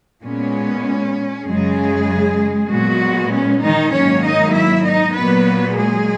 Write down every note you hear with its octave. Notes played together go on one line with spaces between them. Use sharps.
A#2 G#3 B3 C#4
F#2 C#3 F#3 G#3 G#4
A#2 F#3 G#3 B3 F#4
C#4
D#3 D#4
G#2 D#3 F#3 A#3 C#4 C#5
D#4 D#5
E4 E5
D#4 D#5
A#2 F#3 A#3 B3 B4
G#3 G#4